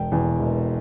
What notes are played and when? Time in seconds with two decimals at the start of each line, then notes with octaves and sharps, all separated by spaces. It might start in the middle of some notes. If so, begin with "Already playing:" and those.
Already playing: E1 G5
0.12 E2 B2
0.39 E1